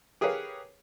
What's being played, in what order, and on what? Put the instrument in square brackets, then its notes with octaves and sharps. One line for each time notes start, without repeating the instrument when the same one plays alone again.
[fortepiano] G4 G#4 A#4 B4 C#5 F5